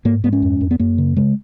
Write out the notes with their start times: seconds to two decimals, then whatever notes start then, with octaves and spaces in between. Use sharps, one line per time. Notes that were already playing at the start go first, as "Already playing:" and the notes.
0.05 G#2 A#3
0.24 G#2 B3
0.33 C#4
0.42 F2
0.61 F2
0.71 B3
0.79 F#2 A#3
0.98 C#3
1.17 C#3 G#3